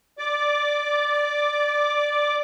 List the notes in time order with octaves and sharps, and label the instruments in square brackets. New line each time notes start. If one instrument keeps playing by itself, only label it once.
[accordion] D5 D6